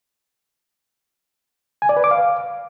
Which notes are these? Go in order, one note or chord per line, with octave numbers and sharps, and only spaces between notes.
G#5
D5
B4
D6
F5